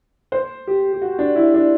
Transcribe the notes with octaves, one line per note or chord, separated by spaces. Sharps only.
C5
G4
G4
F#4
D4
E4
D4